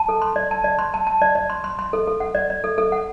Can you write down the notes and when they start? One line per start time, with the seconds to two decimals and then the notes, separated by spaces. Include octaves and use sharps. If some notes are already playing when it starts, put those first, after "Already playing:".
Already playing: A5
0.09 A4
0.22 C6
0.36 D5
0.51 A5
0.64 D5
0.79 C6
0.94 A5
1.07 A5
1.22 D5
1.35 D5
1.50 C6
1.64 C6
1.79 C6
1.93 A4
2.07 A4
2.20 F#5
2.35 D5
2.50 D5
2.64 A4
2.78 A4
2.92 F#5